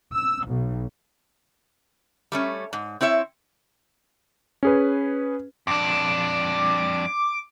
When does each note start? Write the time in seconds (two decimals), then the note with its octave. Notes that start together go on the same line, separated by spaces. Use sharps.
0.14 E6
0.47 B1
2.32 G3 A3 C#4
2.73 G#2
3.01 C4 E4 C#5 E5
4.63 C#4 G#4 B4
5.67 F2 D4 D6